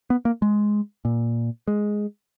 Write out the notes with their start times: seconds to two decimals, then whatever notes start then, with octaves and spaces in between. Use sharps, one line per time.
0.10 B3
0.25 A#3
0.42 G#3
1.05 A#2
1.68 G#3